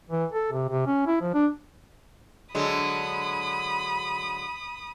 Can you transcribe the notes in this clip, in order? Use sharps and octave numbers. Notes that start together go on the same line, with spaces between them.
E3
A4
C3
C3
C#4
E4
F3
D4
D3 F#3 G#3 B5 D#6